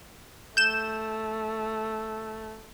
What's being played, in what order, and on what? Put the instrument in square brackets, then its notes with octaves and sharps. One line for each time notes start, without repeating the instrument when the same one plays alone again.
[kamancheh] A3 [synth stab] G6 E7